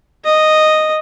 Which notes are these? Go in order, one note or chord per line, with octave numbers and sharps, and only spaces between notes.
D#5